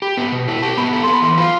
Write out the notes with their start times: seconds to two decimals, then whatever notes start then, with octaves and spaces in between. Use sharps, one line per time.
0.02 G4 B5
0.17 B3
0.32 B2
0.47 E4 A5
0.62 G4 A5
0.77 B3 B5
0.93 A4
1.03 B3 C6
1.13 B5
1.23 E3 C6
1.38 F4 B5